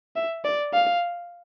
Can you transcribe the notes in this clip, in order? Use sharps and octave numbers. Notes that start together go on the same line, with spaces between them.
E5
D5
F5